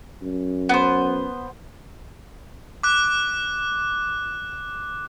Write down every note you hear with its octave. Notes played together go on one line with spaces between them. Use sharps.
F#2
B3 C5
D6 F#6